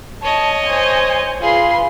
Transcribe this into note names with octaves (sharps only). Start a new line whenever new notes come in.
C#5 D#5 A5
C5 G#5
F4 G#4 B4 C6